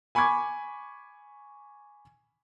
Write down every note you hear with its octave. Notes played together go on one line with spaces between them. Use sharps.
G#5 B5 C#6 D6 G#6